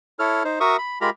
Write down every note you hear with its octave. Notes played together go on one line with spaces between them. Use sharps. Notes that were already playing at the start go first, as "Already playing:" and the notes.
E4 A4 C#5 F6
D#4 C5
F#4 A#4 E5 C#6 D#6
B5
G#3 F4 G4 A#4 A#5 B5